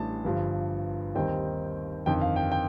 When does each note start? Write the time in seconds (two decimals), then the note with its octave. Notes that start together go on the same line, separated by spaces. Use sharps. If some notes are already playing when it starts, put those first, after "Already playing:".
Already playing: A1 A2 G3 D4 A5
0.24 G1 G2 F3
1.15 D#2 D#3 G3 C4 D#4 G5
2.06 G1 F2 D#3 G5
2.21 F5
2.36 G5
2.52 G5